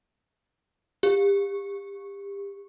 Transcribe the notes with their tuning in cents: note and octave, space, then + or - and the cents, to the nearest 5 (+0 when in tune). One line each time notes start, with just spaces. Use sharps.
G4 +30